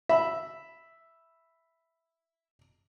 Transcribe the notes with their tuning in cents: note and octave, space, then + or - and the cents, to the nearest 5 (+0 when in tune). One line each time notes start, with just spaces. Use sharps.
E5 +0 B5 +0